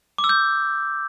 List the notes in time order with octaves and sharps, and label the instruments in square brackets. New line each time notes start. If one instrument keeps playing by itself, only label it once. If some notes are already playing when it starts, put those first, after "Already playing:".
[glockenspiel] D6
E6
G6